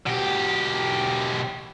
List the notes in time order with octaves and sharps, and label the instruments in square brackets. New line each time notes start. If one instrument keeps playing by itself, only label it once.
[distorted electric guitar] B2 G4